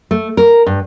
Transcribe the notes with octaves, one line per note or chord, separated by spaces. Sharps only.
A3
A#4
G2